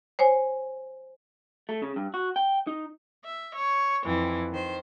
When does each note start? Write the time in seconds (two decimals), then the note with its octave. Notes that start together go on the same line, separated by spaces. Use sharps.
0.19 C5 C#5 G#5
1.69 A3
1.82 C#3
1.96 G2
2.14 F#4
2.36 G5
2.67 D#4
3.24 E5
3.56 C#5
4.06 F2 E3
4.51 D#3 C5